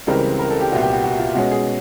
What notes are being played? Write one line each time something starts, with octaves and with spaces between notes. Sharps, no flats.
C#2 C#3 E3 G3 C4 A#4
A#4
A4
G4
C2 A#2 G3 B3 F#4
G4
F#4
F#4
F4
B2 G#3 C#4 F#4
G#4